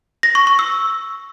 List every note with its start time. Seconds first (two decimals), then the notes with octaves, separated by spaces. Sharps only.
0.23 A#6
0.35 C#6
0.47 C#6
0.59 E6